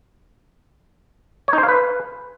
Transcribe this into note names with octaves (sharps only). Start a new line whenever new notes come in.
C#5
D#4
C5
F5
B4